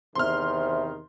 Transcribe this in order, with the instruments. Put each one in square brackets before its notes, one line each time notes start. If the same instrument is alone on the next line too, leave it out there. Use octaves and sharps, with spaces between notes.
[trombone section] E2 C3 D#3 [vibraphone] C5 E5 [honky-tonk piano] C6 F6